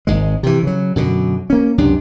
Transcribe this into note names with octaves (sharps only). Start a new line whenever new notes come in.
G#1 G#2 G#3
C3 E3
C#3 F#3
F#2 B2 D3
A#3 C#4
C#2 F#2 C3 D4